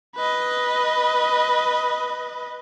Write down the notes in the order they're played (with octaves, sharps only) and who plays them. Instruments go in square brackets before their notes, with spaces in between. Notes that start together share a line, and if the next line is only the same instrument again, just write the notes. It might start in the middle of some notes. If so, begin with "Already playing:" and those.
[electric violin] B4 D#5